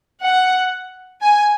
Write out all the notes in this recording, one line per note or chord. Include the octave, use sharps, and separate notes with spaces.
F#5
G#5